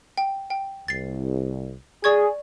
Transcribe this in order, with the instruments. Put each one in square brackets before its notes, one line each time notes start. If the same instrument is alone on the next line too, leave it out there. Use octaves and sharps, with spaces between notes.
[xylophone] G5
G5
[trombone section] C2 [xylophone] A6 C7
[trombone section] G#4 [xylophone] D5 C#6 G#6